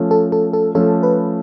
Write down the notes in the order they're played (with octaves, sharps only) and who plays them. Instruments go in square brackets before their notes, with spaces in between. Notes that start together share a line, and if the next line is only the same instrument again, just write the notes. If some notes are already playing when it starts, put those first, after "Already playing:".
Already playing: [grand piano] F3 A3 C#4
[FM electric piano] A4
A4
A4
[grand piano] F3 A3 C#4 [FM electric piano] A4
[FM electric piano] B4